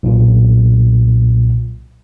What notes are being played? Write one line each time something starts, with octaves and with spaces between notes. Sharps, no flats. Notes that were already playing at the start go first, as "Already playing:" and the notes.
B1 A#2